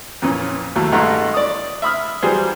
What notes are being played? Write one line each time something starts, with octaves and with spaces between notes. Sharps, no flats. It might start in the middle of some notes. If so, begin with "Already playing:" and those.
F2 A#2 E3 C#4
D#2 F#3 A3 A4
G2 E3 G#3 A3 F#5 A#5
D5 D#6
E5 B5 D#6 F6
E3 F#3 G3 G#4 C5